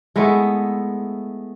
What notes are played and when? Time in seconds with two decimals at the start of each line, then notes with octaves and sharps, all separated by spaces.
0.16 G#3 A3 B3 E4